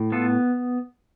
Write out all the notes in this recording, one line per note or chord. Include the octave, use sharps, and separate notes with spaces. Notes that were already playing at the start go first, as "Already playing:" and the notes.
Already playing: A2
B3 F4 A4